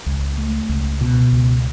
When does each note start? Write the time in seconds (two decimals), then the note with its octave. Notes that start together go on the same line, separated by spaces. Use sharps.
0.06 C#2
0.38 A3
0.69 C#2
1.01 B2
1.33 C#2